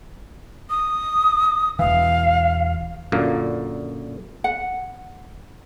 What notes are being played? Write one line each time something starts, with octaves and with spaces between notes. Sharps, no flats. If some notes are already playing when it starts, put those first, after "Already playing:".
D#6
E1 E3 F5
F#2 A#2 D3 A#3
F#5